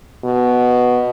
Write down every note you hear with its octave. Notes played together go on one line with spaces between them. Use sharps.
B2